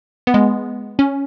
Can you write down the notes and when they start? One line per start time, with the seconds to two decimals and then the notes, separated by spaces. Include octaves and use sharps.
0.27 B3
0.34 G#3
0.99 C#4